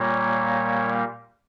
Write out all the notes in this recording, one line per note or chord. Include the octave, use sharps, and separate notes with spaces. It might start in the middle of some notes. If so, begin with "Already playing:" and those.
Already playing: A#2 G3 A#3 C#5